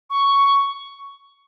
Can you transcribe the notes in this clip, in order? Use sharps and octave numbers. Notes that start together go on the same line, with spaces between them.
C#6